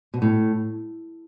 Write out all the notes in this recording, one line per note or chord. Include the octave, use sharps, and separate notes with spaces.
B2
A2